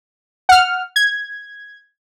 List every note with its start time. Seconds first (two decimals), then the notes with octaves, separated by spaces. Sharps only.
0.49 F#5 F6
0.96 G#6